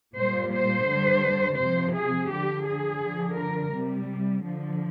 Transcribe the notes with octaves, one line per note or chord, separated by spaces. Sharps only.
A#2 G3 C5
C5
D3 G3
C3 F3 C5
G#4
D3 F3 G4
G#4
D3 F3
A#4
C3 G3
D3 F3